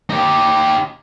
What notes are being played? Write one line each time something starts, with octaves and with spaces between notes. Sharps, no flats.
D#4 G4